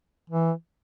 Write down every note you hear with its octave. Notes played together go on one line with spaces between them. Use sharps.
E3